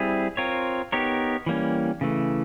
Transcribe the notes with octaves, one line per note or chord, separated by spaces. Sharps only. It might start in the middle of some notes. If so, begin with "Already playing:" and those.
Already playing: G3 C4 E4 G#4
C4 F4 A#4 C#5
B3 D#4 G4 A#4 C#5
E3 G3 A#3 C#4
C#3 E3 A3